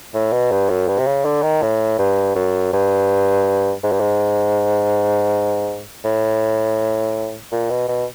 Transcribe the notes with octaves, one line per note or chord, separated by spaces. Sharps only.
A2
B2
G2
F#2
G2
C3
C#3
D3
D#3
A2
G2
F#2
G2
G#2
G2
G#2
A2
A#2
B2
B2